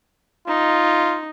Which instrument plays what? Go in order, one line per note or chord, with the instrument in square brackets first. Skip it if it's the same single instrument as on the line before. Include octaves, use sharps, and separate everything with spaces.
[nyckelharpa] D#4 [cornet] F4